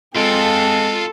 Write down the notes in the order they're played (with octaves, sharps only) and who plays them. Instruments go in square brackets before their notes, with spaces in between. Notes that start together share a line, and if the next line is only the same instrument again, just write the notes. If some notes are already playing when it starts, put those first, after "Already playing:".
[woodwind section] G#3 C4 [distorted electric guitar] F4 G5 [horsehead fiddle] G#4 A5 [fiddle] A4